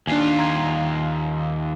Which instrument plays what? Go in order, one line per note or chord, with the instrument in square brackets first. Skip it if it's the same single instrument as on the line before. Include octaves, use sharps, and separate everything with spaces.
[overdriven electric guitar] D#2 F4 [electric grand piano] D4 G#5
[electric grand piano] A#5 C6 G#6